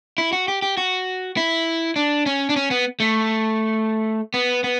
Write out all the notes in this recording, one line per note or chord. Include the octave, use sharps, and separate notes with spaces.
E4
F#4
G4
G4
F#4
E4
D4
C#4
D4
C#4
B3
A3
B3
B3